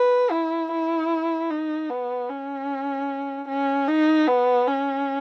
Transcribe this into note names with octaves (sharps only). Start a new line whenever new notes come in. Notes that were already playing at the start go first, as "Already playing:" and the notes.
Already playing: B4
E4
E4
D#4
B3
C#4
C#4
D#4
B3
C#4